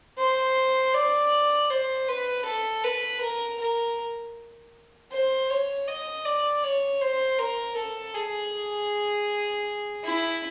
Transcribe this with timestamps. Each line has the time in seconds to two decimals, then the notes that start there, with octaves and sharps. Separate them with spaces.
0.18 C5
0.95 D5
1.70 C5
2.08 B4
2.45 A4
2.84 B4
3.22 A#4
3.60 A#4
5.12 C5
5.50 C#5
5.88 D#5
6.25 D5
6.64 C#5
7.01 C5
7.39 A#4
7.76 A4
8.15 G#4
10.04 E4